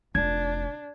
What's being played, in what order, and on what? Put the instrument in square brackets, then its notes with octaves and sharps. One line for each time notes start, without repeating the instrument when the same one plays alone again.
[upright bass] F1 [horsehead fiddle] D4 [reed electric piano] G#6